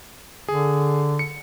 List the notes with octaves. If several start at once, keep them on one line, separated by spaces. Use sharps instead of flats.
D3 G#4
C#7